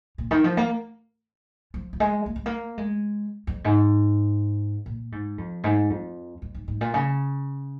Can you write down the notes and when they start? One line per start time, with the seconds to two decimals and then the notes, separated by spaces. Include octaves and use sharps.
0.18 A#2
0.31 D#3
0.44 F3
0.57 A#3
1.74 F3
1.93 F3
2.00 G#3
2.26 A#3
2.36 G#3
2.46 A#3
2.78 G#3
3.47 F2
3.64 G#2
4.86 A#2
5.12 G#2
5.38 F2
5.64 G#2
5.90 F2
6.42 F2
6.54 G#2
6.68 G#2
6.81 A#2
6.94 C#3